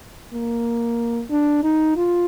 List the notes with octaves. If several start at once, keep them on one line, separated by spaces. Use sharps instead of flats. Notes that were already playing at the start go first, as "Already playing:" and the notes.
A#3
D4
D#4
F4